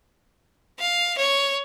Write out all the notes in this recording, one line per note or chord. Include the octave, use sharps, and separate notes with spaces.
F5
C#5